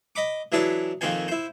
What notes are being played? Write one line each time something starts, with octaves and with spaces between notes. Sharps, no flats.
D#5 B5 D6
E3 F#3 D4 E4 G#4
F2 D#3 A#3 C4 C5 G#5
E4 C5